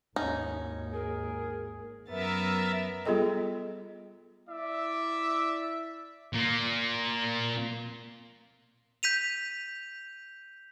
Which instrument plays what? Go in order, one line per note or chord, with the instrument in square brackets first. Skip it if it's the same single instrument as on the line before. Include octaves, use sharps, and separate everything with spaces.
[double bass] G#1 D#2 [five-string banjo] C#4 D#4
[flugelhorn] G#4 [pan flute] A#4
[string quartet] F#2 B3 A6 [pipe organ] A#4 E5
[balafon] G3 B3 F4 G#4 A4 D#5
[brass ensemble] E4 D5 E5
[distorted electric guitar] A#2 A#3
[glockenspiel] G6 B6 D#7 F7